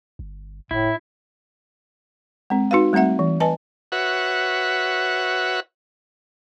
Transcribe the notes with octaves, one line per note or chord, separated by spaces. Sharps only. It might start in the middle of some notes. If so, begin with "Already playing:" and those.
G1
F#1 A2 E4
G#3 C4
D#4 F#4 B4 F5
G3 A3 C4 E5 F#5
E3
B4 D#5 G#5 A5
F#4 B4 C#5 E5 F#5